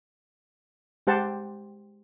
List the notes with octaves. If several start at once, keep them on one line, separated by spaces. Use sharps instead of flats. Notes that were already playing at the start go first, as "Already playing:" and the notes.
G#3 G4 C5 F#5 A5